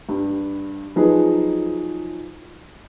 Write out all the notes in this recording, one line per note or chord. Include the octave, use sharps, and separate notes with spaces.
G2
F3 F#3 D#4 G#4 B4